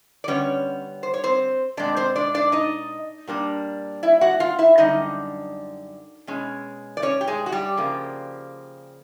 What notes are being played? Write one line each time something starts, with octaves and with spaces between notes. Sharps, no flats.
D5
D3 G3 B3 C#4 C#5
C5
C#5
C4 C5
B2 G#3 C4 D4 D5
C4 C5
D4 D5
D4 D5
D#4 D#5
A#2 G3 A#3 D4
E4 E5
F#4 F#5
F4 F5
E4 E5
F#2 D3 G3 D#4 D#5
B2 G#3 C#4
D5
C#4 C#5
G4
G#3 G#4
F#4
G3 G4
C#3 F3 A#3